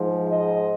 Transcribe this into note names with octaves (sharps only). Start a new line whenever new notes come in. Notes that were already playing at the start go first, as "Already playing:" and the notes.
Already playing: G#2 F3
D#5